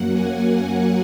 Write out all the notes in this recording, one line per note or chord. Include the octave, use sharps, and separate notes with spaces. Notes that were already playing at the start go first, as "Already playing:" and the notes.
Already playing: F#2 F#3 A#3 F#5
G#5
F#5